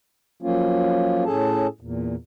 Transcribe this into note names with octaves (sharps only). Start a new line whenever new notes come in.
F3 F#3 A#3 C#4 F4
A2 C#4 G#4 A4 A5
E2 A#2